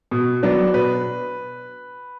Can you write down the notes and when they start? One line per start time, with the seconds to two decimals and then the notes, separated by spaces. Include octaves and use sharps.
0.11 B2
0.43 F#3 B3 D4
0.74 B2 B4